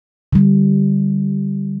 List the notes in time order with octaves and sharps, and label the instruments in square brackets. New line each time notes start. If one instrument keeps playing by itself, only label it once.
[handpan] D3 G3